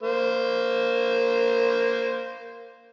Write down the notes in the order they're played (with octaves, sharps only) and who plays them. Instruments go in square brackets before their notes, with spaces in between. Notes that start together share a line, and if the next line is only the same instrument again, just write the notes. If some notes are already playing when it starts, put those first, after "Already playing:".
[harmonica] A#3 C5